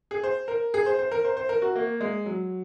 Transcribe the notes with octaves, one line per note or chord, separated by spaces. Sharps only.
G#4
C5
A#4
G#4
C5
C5
A#4
C5
C5
A#4
F#4
A#3
G#3
F#3